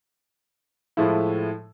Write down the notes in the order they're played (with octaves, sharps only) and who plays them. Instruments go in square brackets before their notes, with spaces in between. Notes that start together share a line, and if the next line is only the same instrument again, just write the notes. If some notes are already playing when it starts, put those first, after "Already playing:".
[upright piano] A2 F3 G#3 E4